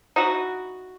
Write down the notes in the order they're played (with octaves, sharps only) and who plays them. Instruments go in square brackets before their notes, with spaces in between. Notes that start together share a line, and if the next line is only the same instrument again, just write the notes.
[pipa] D#4 E4 F#4